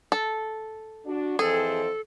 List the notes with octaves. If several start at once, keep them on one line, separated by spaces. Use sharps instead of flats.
A4
D4 F#4
F2 E3 C4 G#4 A4